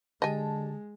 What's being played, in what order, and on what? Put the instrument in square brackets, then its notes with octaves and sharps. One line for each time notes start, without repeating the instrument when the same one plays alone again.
[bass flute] D3 [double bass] G#3 [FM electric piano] G4 A5 [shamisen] D#5 G#5